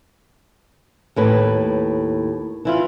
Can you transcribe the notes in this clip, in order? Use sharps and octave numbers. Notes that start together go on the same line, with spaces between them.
D#2 A2 B4
E3 E4 F4